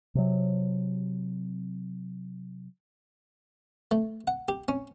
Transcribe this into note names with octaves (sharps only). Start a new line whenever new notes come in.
C3 F#3
A3
F#5
G4
C#4